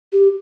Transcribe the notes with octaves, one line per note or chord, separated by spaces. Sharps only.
G4